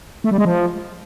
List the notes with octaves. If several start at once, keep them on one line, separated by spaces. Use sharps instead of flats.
A3
G3
G#3
F3